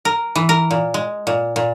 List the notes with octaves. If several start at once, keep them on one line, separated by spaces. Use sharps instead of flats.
A#4
E3
A#4
A#2
G#3
A#2
A#2